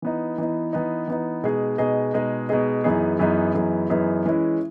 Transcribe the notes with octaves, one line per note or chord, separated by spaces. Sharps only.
E3 B3 D#4
E3 B3 D#4
E3 B3 D#4
E3 B3 D#4
B2 G#3 D#4 G#4 D#5
B2 G#3 D#4 G#4 D#5
B2 G#3 D#4 G#4 D#5
B2 G#3 D#4 G#4 D#5
F#2 E3 B3 D#4 G#4
F#2 E3 B3 D#4 G#4
F#2 E3 B3 D#4 G#4
F#2 E3 B3 D#4 G#4
E3 G#3 C#4 E4